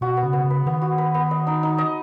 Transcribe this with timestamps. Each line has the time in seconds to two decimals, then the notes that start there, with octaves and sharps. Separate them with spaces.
0.01 B2 F#4
0.17 B3
0.22 C#3
0.33 B3
0.44 C#3
0.50 B4
0.66 D#3 B3
0.82 F#4
0.98 B4
1.14 B3
1.31 D#5
1.47 D#4
1.63 D#4
1.78 D#5